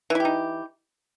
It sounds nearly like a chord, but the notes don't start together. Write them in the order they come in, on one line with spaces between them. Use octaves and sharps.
E3 E4 G4 D#4